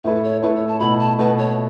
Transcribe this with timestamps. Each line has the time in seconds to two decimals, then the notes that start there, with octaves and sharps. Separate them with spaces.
0.04 A2 A3 E4 A4 B4
0.23 C#5
0.42 A2 A3 E4 A4 B4
0.56 C#5
0.68 A5
0.80 B2 A3 E4 B5
0.99 A5
1.19 B2 A3 E4 B4
1.38 C#5